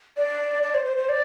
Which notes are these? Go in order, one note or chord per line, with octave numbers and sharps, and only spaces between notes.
D5
D5
C5
C5
C5
D5